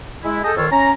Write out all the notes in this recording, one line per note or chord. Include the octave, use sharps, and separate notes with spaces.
G#3 E4
G#4 A4 D#5 G5 A5
F2 D#3 F4 C#5 E6
C#4 A#5